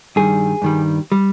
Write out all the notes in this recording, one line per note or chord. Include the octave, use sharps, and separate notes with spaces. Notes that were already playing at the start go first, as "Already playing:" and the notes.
G2 D#3 G3 G#4
G2 D#3 G3
G3